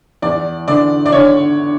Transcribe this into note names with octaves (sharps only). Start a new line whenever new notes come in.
E2 D5
D3 D5
D5
D3 C#5